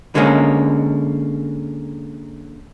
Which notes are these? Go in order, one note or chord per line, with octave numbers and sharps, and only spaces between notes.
D3 G#3 A#3 C#4